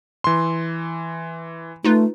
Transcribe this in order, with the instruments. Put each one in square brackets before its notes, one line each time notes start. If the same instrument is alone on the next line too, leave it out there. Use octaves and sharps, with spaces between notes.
[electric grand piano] E3 C6
[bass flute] A3 [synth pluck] D#4 F4 B4